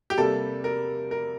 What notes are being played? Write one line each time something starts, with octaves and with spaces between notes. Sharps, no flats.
G4
C3 G3 A#3 A4
A#4
A#4